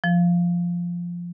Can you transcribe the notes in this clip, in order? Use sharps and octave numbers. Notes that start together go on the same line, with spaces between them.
F3